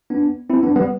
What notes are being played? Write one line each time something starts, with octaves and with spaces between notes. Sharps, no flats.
B3 D4
C4 E4
B3 D4
G3 B3